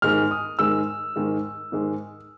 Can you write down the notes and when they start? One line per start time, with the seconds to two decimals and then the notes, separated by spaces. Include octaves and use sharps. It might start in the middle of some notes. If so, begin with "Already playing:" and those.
0.02 G#2 D#3 G#3 F6
0.31 D#6
0.59 G#2 D#3 G#3 E6
1.16 G#2 D#3 G#3
1.72 G#2 D#3 G#3